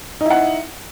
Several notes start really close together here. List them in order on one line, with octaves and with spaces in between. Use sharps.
D#4 E4 F#5